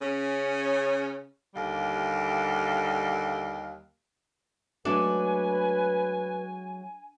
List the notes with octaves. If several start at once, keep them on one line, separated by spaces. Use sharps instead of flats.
C#3 C#4
D#2 D3 G3 F5
F#3 G#3 A3 D4 B4 G#5